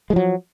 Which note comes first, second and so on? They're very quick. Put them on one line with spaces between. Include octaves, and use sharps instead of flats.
G#3 F3 F#3